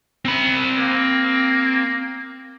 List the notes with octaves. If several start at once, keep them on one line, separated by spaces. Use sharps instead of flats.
C4 B5
A#3